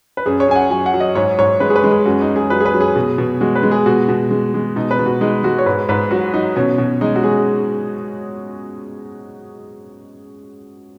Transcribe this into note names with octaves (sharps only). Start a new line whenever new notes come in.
B4
F#2 G#4
C#5
F#2 G#5
F#5
F#3 G#5
F#5
F#3
D#5
G#2 C#5
G#2 C#5
G#3 B4
G#4
B4
G#3
G#4
F#2 F#4
D#4
F#2
G#4
F#3 B4
G#4
B4
F#3
G#4
B2
B2
G#3 F#4
B4
G#3
G#4
B2 F#4
B2
G#3
G#3
B2 D#4
B4
B2
F#4
G#3 D#4
G#3 F#4
C#5
G#2 B4
G#2 B4
F#3 F#4
F#3 D#4
B2 C#4
B2
G#3 D#4
F#4
G#3 G#4